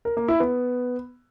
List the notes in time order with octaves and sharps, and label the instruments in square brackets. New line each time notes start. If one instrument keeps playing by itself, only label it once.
[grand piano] A#4
A#3
E4
B3